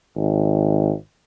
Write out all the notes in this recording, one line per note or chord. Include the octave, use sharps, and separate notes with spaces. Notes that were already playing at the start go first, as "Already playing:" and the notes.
G#1